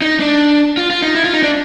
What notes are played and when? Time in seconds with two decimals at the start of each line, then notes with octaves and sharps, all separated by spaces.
0.02 D#4
0.20 D4
0.77 F4
0.90 F4
1.02 D#4
1.15 E4
1.24 F4
1.34 D#4
1.43 D4